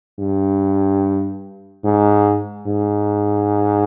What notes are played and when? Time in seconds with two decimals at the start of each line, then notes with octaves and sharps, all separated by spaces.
0.19 G2
1.84 G#2
2.67 G#2